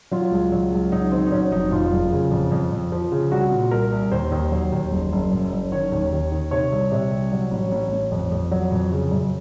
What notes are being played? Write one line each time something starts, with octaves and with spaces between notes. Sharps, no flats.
F#3 F4
C#2
F#3
C#2
F#3 D#4
D#3 C4
D#4
F#3 C#4
F1 D#4
F2 F4
F#1
C#3
F2
F2
F2
F3
C#3
C2 F#4
A#2
C2 A#4
C2
D#2 C5
D#2
F#3
D#2
F#1
F#1
F#2
F#1
D#3 C#5
D#2
D#2
D#3
C3 C#5
C2
C3
C2
F#3
A1
A1
A1
F2
F2
F#3
F2
C#3
F#2